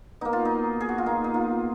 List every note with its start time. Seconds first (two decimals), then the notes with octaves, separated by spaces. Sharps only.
0.21 B2 A#3 D#4
0.33 F4
0.45 D#4
0.81 G#4
0.89 F#4
0.98 F4
1.06 B2 A#3 D#4
1.24 D#4
1.34 F4